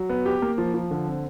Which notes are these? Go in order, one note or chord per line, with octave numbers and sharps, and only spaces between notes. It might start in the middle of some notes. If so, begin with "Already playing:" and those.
Already playing: F#3
B3
G4
A#3
F3
F3
D3
C4